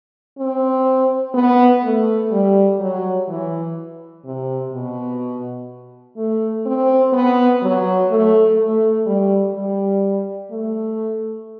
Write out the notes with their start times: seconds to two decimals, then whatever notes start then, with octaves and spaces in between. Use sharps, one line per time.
0.38 C4
1.34 B3
1.83 A3
2.32 G3
2.80 F#3
3.28 E3
4.25 C3
4.72 B2
6.17 A3
6.66 C4
7.13 B3
7.62 F#3
8.10 A3
8.58 A3
9.06 G3
9.54 G3
10.51 A3